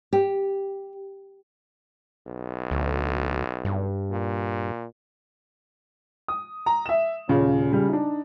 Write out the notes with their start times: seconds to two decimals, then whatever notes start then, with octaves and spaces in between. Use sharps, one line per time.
0.13 G4
2.27 B1
2.71 D2
3.65 G2
4.11 A#2
6.28 D#6
6.66 A#5
6.86 E5 E7
7.28 D#1 C#3 F4
7.72 C#3 G3
7.89 D4 D#4